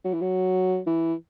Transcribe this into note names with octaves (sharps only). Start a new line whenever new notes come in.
F#3
E3
F#3
E3